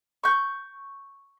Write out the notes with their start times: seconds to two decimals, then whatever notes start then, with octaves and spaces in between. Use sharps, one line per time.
0.24 C#6 G6